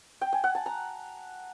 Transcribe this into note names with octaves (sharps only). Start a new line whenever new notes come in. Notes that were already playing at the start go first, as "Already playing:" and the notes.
G5
G#5
F#5
A5
A#5